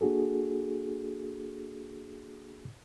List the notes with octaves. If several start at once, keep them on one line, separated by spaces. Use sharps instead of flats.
A#3 D4 F#4 G#4 A4